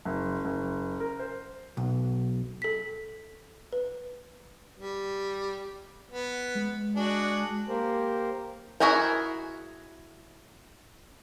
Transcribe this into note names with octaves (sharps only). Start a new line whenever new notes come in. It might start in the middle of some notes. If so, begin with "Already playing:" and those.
F#1
F#1
A#4
C5
B1
A4 B6
B4
G3
B3
G#3
D4 F#4 G#4
A#3 G4 A#4 C5
E4 F#4 G#4 A#4 C5